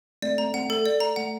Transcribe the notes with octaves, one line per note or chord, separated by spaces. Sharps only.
A3 C4 D5
A3 C4 A#5
A3 C4 F#5
A3 A4
D5
A#5
A3 F#5